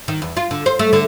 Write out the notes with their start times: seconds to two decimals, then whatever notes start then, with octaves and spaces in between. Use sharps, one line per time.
0.08 D#3
0.22 E2
0.37 F4
0.51 D3
0.66 C5
0.79 A3
0.93 D3